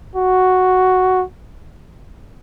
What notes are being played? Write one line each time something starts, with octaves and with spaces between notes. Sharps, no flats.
F#4